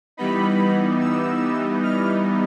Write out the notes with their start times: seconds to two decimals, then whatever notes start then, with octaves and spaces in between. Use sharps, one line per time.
0.17 E3 G3 B3 D#4 B5
1.00 E6
1.82 F6